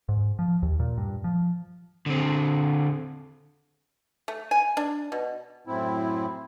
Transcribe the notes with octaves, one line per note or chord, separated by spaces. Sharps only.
G#2
F3
D#2
A#2
G2
F3
D3 C4
A3
G#5
D4
B2
F#2 A2 C4 E4